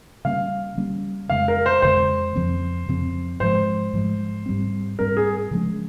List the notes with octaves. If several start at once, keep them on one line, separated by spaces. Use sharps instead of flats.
C#3 G3 A#3 C#4 F5
C#3 G3 A#3 C#4
F2 C#3 G#3 F5
A#4
C5
F2 C#3 G#3 C5
F2 C#3 F3 C4
F2 C#3 F3 C4
G#2 F3 G#3 C5
G#2 F3 G#3
G#2 G3 C4
G#2 G3 C4 A#4
G#4
C#3 F3 G#3 C#4